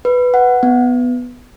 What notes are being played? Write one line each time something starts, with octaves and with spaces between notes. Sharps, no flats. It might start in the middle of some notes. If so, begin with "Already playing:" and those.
B4
F#5
B3